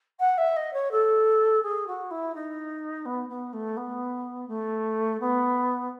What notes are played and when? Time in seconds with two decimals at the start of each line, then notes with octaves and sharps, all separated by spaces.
0.19 F#5
0.37 E5
0.56 D#5
0.73 C#5
0.91 A4
1.62 G#4
1.87 F#4
2.10 E4
2.34 D#4
3.05 B3
3.29 B3
3.53 A3
3.76 B3
4.48 A3
5.20 B3